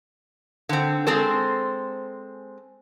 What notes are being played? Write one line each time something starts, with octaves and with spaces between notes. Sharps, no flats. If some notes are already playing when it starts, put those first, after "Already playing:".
D3 C4
G#3 C4 A4 C5